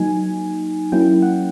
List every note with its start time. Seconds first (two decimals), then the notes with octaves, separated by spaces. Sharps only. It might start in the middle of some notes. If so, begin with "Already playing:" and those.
Already playing: F#3 A#3 D#4 G#5
0.92 F#3 A#3 C#4 E4 G5
1.22 F#5